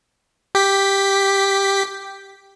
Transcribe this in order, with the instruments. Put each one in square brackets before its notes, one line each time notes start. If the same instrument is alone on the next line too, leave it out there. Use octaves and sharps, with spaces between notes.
[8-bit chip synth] G4 B6